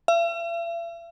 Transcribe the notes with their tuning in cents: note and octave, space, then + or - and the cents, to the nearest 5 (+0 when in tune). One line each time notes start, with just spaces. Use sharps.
E5 +45